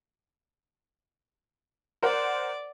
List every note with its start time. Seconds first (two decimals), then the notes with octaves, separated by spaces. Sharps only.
2.02 A#4 C5 D5 F#5